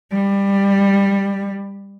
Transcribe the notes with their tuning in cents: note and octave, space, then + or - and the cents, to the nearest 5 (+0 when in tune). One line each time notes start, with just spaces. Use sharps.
G3 +15